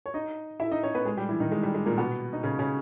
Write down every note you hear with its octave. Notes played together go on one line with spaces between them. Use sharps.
C#5
D#4 D#5
E4 E5
D#4 D#5
C#4 C#5
B3 B4
G#3 G#4
G3 G4
E3 E4
D#3 D#4
G#3
G3
G#3
A#2 A#3
B2 B3
D#4
C#3 C#4
C#3 C#4